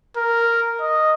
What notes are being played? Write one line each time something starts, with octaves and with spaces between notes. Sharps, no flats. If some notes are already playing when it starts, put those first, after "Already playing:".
A#4
D#5